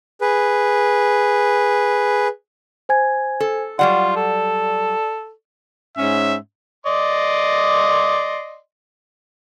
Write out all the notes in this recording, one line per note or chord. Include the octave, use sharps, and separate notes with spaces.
G#4 B4
C5 G#5 G#6
A4
F#3 G3 F4 D5 F#5
A4
G#2 C#4 E5
D5 D#5 C6